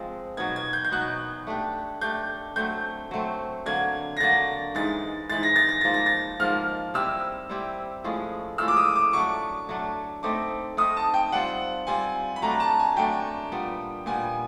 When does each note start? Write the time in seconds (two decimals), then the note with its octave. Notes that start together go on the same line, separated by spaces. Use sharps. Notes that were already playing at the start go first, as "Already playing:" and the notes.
Already playing: F3 G#3 C4
0.37 B2 F#3 B3 D#4 G#6
0.56 G#6
0.73 G6
0.85 G6
0.91 B2 F#3 B3 D#4 F#6
1.47 A3 D4 G4
2.01 A3 D4 G4 G6
2.56 F#3 A3 C4 G6
3.11 F#3 A3 C4
3.66 D3 F#3 A#3 G#6
4.17 A#6
4.20 D3 F#3 A#3 A6
4.75 G#2 E3 G#3 A6
5.30 G#2 E3 G#3 A6
5.43 A#6
5.56 A6
5.69 A#6
5.81 G#2 F3 A#3 A6
5.94 A#6
6.06 A6
6.40 G#2 F3 A#3 F6
6.94 G3 C4 E4 G4 E6
7.49 G3 C4 E4 G4
8.04 A2 F3 G#3 C#4
8.58 A2 F3 G#3 C#4 E6
8.68 D6
8.77 D#6
8.96 D6
9.13 F#3 A3 D4 C#6
9.69 F#3 A3 D4
10.23 A3 C4 D#4 D6
10.77 A3 C4 D#4 D#6
10.97 A5
11.14 G5
11.32 G3 C4 F4 F#5
11.87 G3 C4 F4 G#5
12.36 B5
12.42 F#3 A3 D4 A#5
12.60 A5
12.79 G#5
12.96 F#3 A3 D4 G5
13.52 A#2 G3 B3
14.06 A#2 G3 B3 G#5